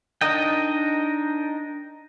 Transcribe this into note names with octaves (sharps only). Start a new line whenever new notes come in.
D4 D#4 A#4 D#5 G5